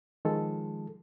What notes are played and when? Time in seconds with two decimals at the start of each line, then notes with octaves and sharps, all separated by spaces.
0.25 D#3 F3 G#3 A4